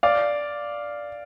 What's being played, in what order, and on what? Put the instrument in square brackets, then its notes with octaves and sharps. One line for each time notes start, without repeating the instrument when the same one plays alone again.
[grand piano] D5 F5